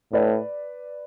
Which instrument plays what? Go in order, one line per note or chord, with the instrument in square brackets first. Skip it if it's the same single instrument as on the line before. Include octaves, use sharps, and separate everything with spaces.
[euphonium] A2 [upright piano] B4 D5